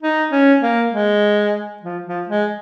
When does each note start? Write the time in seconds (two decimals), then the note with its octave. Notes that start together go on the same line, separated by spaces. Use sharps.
0.02 D#4
0.32 C#4
0.62 A#3
0.92 G#3
1.82 F3
2.06 F3
2.29 G#3